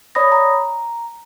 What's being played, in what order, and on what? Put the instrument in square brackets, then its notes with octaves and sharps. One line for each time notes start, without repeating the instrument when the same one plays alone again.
[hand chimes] C#5 D5 B5 D#6 A#6
A#5